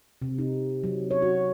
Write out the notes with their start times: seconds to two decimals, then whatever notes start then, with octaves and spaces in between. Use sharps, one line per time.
0.22 C3
0.38 D#4
0.83 F#3
1.11 C#5
1.22 F#4